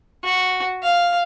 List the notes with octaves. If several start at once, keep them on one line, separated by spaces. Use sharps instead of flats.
F#4
F5